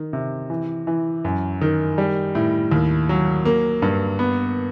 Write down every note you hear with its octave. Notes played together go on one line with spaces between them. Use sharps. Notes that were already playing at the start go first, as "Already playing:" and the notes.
Already playing: D#3
C3
E3
E3
F#2
D#3
G3
A2
D#2
F#3
A#3
G2
B3